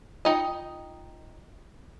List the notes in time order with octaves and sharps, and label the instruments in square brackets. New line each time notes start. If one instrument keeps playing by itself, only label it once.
[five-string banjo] D#4 D#5 [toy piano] F4 G5